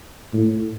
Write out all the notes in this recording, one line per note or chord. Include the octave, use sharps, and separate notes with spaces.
A2